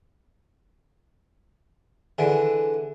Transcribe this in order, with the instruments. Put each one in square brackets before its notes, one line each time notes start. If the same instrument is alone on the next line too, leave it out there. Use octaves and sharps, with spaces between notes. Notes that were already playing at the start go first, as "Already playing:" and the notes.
[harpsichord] D3 E3 [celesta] G#4 E5 G#5